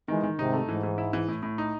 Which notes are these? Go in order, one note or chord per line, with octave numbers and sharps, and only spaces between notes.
D#3 E3 G#3
D#3
G#2 C3 D#4
A3
G#2 E3
E3
E4
E3
A2
A2
D#4